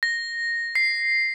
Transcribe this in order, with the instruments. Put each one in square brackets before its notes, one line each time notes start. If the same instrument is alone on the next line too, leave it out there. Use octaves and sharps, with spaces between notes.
[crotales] A#6
C7